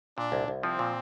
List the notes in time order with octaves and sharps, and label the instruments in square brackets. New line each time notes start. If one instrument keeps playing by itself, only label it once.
[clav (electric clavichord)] A#2 [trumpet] D4
[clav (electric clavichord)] C2
C2
[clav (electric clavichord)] F3 [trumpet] C4
[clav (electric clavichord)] A#2